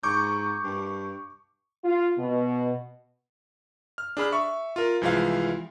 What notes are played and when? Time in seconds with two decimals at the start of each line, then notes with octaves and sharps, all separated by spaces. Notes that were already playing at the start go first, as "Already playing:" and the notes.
0.03 G#2 C#6 D6 G6
0.63 G2
1.84 F4
2.18 B2
3.98 F6
4.17 D4 G#4 B5 F6
4.32 E5 C#6
4.76 F4 A#4
5.01 C2 E3 F3 G#3 F5